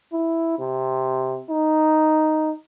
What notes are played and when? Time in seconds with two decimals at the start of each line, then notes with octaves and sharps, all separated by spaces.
0.12 E4
0.59 C3
1.50 D#4